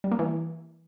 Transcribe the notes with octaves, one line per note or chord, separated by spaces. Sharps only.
G3
A#3
E3